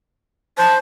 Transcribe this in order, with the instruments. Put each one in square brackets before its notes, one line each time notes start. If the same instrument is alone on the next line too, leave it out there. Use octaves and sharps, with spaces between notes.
[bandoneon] C5 [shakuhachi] A5